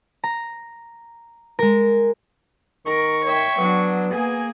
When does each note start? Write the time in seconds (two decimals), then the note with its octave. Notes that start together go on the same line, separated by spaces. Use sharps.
0.24 A#5
1.59 G#3 A#4
2.86 D#3 A#4 C#6
3.24 C#5 E5 G5
3.58 F#3 B3 D4
4.12 A#3 G#4 G#5